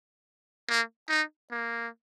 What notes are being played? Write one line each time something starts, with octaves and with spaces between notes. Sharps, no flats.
A#3
D#4
A#3